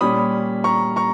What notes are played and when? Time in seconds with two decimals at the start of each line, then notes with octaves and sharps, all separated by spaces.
0.01 A#2 G3 C#4 B5 D#6
0.64 A#5 C#6
0.96 A#5 C#6